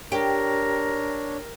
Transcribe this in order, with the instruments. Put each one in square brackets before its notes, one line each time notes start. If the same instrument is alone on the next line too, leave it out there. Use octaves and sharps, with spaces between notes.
[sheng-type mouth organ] D4 C#5 [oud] G4 [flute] A#4